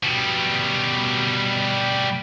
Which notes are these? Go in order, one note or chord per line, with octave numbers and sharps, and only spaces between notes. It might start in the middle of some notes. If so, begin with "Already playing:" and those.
B2 G3